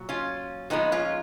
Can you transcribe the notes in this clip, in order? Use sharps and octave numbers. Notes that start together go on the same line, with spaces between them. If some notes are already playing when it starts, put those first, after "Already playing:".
Already playing: A#2 F#3
C#4 F4
A#2 F3 G#3 B3 D#4
C#4 F4